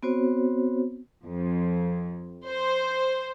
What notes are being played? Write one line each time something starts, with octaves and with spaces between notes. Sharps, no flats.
B3 C4 F#4 C5 C#5
F2
C5